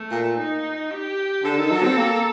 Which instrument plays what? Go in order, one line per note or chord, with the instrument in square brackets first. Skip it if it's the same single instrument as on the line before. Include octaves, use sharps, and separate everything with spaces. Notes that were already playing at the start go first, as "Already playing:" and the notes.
Already playing: [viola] A3
[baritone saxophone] A#2
[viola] D#4
G4
[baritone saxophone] D3 [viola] A4
[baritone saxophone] D#3
F#3
C4
A#3